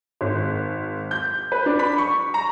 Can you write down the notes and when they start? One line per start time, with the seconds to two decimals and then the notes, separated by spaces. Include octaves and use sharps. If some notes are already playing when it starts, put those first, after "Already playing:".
0.21 G#1
1.11 G6
1.52 B4
1.66 D4
1.79 B5
1.98 C#6
2.34 A#5